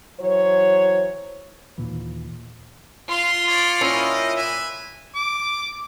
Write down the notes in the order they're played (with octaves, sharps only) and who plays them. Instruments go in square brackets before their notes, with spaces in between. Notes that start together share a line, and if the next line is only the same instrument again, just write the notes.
[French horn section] E3 F#3 C5 C#5
[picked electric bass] D#2 A#2 E3
[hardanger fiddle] F4 [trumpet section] C6
[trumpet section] C#5 D5
[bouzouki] A#2 C#4 E4 [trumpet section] G4 D#5
[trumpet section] B4 E5 G#5
[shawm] D6